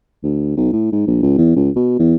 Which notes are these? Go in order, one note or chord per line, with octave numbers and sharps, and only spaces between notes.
D2
B1
A2
G#2
A#1
C#2
E2
C#2
B2
E2